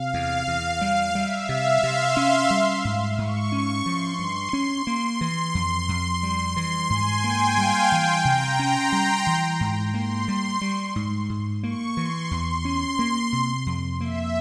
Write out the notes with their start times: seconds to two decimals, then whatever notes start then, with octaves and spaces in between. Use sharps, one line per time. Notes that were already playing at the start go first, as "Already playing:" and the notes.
Already playing: C3 F5
0.14 E2
0.48 E2
0.81 G3
1.15 G3 E5
1.49 C3 F5
1.83 C3 C6
2.17 C#4
2.50 G3
2.85 G#2
3.18 G#2 C#6
3.52 C#4
3.85 F3 C6
4.19 G2
4.53 C#4
4.87 A#3
5.21 E3 C6
5.55 F2
5.89 F2
6.23 G3
6.56 E3 C6
6.90 G#2 G#5
7.24 A#3 G5
7.57 G3 F5
7.92 E3 G5
8.25 C3 A#5
8.59 C#4 C6
8.92 G3 C6
9.27 E3
9.60 G#2
9.94 A#3 C6
10.28 G3
10.61 G3 C#6
10.96 G#2
11.30 G#2
11.63 A#3 C#6
11.97 E3 C6
12.31 E2 C6
12.65 C#4
12.99 A#3
13.32 C3 C6
13.66 F2
14.00 A#3 E5